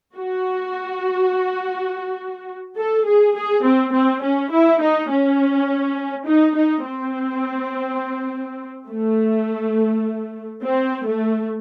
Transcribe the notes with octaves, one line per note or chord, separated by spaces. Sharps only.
F#4
A4
G#4
G#4
C4
C4
C#4
E4
D#4
C#4
D#4
D#4
C4
A3
C4
A3